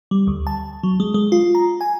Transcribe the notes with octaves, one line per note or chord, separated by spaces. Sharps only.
G3
D2
A5
F#3
G#3
G#3
F4
A#5
G#5